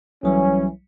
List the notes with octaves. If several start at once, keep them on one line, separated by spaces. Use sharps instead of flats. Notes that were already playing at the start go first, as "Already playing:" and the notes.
B1 E3 F#3 G3 C#4